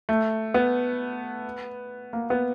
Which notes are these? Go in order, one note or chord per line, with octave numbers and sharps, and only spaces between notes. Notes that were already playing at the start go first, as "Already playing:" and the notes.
A3
B3
A#3
B3